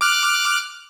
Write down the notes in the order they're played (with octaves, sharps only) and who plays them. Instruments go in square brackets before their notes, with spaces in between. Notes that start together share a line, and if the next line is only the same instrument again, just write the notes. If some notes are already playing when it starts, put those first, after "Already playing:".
[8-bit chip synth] D6 F6 F#6